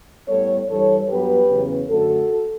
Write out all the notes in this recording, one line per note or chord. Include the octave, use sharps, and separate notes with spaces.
A2 G3 B3 A4 C#5
G2 E3 G3 A4 C#5
G2 F#3 B3 G4 B4
E2 C#3 F#3 C#4
F#2 D3 A3 F#4 A4